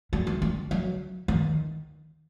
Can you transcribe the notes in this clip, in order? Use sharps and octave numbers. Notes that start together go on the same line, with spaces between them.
G3
A3
G3
F#3
D#3